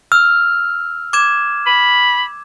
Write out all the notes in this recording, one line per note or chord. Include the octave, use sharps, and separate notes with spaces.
E6 F6
D6 G#6 E7
B5